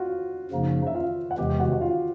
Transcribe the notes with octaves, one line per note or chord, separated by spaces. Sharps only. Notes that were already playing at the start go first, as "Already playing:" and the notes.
Already playing: F4 F#4 F#5
F#2 C#3 F3 A#3 D#4
E5
F4 F5
F#5
E2 C3 E3 G#3 G4 G5
G5
F#4 F#5
F#5
F4 F5